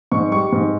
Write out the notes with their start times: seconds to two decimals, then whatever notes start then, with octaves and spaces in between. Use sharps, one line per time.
0.12 G#2 C#6
0.31 G3 C#6
0.53 G#2